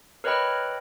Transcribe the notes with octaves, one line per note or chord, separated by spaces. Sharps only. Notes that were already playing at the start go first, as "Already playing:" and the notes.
A#4 B4 C#5 D#5 G5 B5